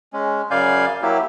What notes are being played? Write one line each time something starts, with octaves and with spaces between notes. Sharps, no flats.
G#3 C#4
F#2 C#3 D5 F5 G#5 G6
F#3 A#3 E4 G4